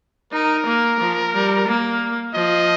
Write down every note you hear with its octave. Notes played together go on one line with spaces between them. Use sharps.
D#4 A#4
A#3
F3
G3
A#3
F3 D#5